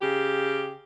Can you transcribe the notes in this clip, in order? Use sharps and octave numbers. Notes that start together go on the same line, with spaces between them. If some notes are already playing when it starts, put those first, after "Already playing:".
C#3 G4